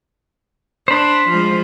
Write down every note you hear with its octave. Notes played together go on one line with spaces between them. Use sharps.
D4 C5 B5
F3 G#3